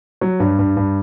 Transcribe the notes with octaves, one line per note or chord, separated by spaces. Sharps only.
F#3
G2
G2
G2